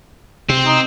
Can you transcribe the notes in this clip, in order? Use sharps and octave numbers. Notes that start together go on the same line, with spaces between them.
C3 C4
D#4